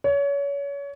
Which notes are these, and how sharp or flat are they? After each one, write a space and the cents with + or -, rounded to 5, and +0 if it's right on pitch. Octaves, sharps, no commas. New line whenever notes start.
C#5 +30